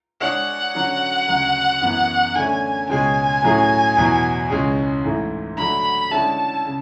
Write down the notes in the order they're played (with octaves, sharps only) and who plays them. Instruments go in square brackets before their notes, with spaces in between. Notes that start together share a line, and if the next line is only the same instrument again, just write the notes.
[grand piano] G#3 D4 G#4 C#5 [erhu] F#5
[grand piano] D3 F#3 C#4 F#4
D2 C#3 F#3
F#2 E3 B3
[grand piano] D3 A3 C#4 [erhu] G#5
[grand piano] C#2 B2 G#3 C#4 G#4 [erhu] G#5
[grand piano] A2 F#3 A3 C#4 G#4
E2 B2 F#3
C#2 C#3 G#3 C#4 G#4
G#2 E3 A3
[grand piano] D3 F#3 A3 [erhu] B5
[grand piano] D3 G#3 C#4 E4 A4 [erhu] A5
[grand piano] C#3